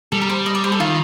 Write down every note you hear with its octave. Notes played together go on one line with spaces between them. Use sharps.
G3 A4
A#4
C5
D#5
D5
C5
A4
D#3 F4